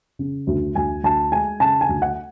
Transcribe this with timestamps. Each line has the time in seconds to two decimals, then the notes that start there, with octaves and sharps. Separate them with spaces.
0.19 C#3
0.47 D2
0.75 D2 G#5
1.03 D2 A5
1.32 G#3 G#5
1.60 C#3 A5
1.81 G#5
1.89 D2
2.02 F#5